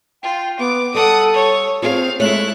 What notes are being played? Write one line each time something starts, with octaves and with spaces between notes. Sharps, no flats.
F4 G5
B3 D6
G3 A4 F#5 D#6
C#5
C4 F4 G#4 C#5 F5
G#3 A3 E4 C#5 F#6